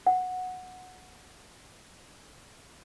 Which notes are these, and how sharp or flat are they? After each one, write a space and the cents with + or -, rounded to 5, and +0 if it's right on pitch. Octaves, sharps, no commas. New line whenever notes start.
F#5 -10